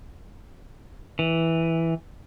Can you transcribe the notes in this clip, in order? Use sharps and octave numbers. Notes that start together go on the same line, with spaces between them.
E3